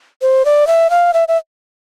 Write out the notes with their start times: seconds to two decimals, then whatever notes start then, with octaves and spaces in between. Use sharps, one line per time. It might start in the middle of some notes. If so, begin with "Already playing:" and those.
0.22 C5
0.45 D5
0.67 E5
0.90 F5
1.14 E5
1.28 E5